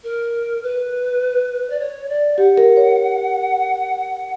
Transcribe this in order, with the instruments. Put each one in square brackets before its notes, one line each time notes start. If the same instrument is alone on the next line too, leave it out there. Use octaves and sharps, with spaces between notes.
[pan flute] A#4
B4
D5
C#5
D5
[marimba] G4 [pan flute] F#5
[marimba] A#4
C#5